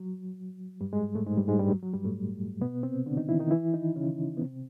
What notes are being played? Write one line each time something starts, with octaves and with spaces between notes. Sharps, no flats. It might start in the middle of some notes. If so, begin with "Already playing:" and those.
Already playing: F#3
G2 G3
G#2 G#3
A2 A3
G#2 G#3
G2 G3
G#2 G#3
G2 G3
F#3
F#3
G2 G3
A2 A3
B2 B3
C3 C4
D3 D4
D#3 D#4
E3 E4
D#3 D#4
E3 E4
D#3 D#4
C#3 C#4
B3
C3 C4